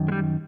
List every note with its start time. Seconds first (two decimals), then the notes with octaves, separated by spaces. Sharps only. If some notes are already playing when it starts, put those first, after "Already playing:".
Already playing: F#2 D#3
0.08 G#3
0.12 G3